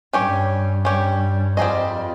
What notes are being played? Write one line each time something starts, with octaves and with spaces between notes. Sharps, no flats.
G2 C#4 G4 C#5
G2 C#4 G4 C#5
F2 G3 C4 D#4 G#4 D#5